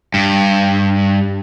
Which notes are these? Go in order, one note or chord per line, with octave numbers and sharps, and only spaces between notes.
G2